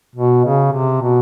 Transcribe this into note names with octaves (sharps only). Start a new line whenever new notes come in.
B2
C#3
C3
B2